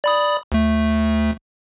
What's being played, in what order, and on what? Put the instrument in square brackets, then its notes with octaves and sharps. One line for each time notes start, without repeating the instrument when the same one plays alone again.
[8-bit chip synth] D5 B5 D#6
D2 A3